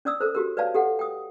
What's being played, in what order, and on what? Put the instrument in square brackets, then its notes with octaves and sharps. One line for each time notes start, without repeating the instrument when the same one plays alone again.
[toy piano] C#4 D5 D#6 E6
A4 A#4 C5
F#4 G4 A#4
B4 C#5 D5 F5 A5
G4 A4 F#5
G5 D#6